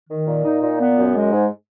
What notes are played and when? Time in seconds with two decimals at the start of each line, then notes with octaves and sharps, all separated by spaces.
0.09 D#3
0.27 A#2
0.44 D#4
0.63 A#2
0.79 B3
0.98 F#2
1.16 G#3
1.32 G#2